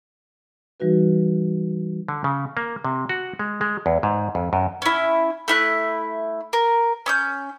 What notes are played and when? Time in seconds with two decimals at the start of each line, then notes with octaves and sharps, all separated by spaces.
0.80 E3 G3 D#4 F#4 B4
2.08 D3
2.24 C#3
2.57 A#3
2.85 C3
3.09 F#4
3.39 G#3
3.61 G#3
3.86 E2
4.03 G#2
4.35 F2
4.53 F#2
4.82 C#4 E4
5.48 A3 E4 F#6
6.53 A#4
7.06 C#4 D#6 G6